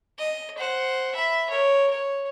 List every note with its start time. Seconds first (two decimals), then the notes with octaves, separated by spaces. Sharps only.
0.19 D#5
0.58 C5 F#5
1.15 E5 B5
1.50 A#4 C#5
1.91 C#5